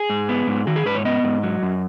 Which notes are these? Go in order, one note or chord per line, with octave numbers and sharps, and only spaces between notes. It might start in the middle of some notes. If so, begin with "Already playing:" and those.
Already playing: G#4
G#2
B3
G#2
D#3 F#4
G#4
G#2 B4
C#5
B3 D#5
G#2
F#3
F#2